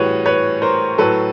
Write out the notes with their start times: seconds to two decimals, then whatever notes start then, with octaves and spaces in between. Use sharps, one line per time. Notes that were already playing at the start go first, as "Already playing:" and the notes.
Already playing: A2 E3 G3 F#4 G#4 B4 C#5
0.26 B4 C#5
0.62 A#4 C5
0.98 A2 F#3 A4 B4